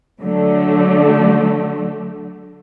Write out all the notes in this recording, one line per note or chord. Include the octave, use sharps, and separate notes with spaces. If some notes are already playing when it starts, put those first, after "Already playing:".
D3 F#3 A3